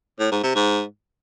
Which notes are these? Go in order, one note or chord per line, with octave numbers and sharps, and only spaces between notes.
A2
G#2
C3
G#2